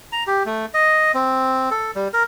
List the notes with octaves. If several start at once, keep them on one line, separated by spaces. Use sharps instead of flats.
A#5
G4
A3
D#5
C4
A4
G3
A#4